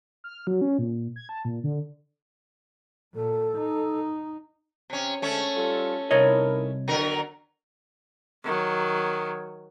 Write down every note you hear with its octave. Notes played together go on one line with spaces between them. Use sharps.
F6
F#3
C#4
A#2
G#6
A5
A#2
D3
A#2 A4
D#4
C3 C#4
D3 G#3 A3 C#4
G3 F4 A4
C2 D#4 E4 A#4 C#5 D#5
E2 D3 F#3 A#4
D#3 F#3